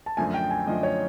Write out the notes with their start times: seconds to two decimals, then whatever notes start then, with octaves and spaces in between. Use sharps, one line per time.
0.06 A5
0.17 F#2 D3 F3 A3 G#5
0.34 G5
0.51 G#5
0.67 F#2 D3 F3 A3 D#5
0.83 C#5